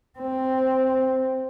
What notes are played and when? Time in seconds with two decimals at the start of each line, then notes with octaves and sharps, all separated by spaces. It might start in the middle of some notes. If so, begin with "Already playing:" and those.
0.19 C4